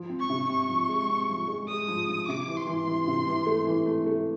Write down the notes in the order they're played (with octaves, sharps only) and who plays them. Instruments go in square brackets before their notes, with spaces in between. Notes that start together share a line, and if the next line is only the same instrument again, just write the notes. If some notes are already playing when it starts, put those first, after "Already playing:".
Already playing: [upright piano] F3
C4
[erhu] C#6
[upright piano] C3
[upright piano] C4 [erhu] C#6
[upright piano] F3
G#3
C4
F3
G#3
[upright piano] G#3 [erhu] D#6
[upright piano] F3
F3
[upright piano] C3 [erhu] D6
[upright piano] E3
[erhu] C6
[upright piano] E3
E3
C3
E3
A3
E3
A3
A3